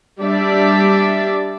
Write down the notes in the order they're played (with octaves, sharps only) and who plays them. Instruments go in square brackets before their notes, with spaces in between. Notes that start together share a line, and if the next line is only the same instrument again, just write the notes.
[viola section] G3 D4 D5 E5